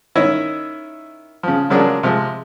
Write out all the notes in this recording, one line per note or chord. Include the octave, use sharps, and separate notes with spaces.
D#3 C#4 E4 C#5 D#5
C#3 F3
C#3 F3 F#3 G#3 D4 A#4
C3 F3 G#3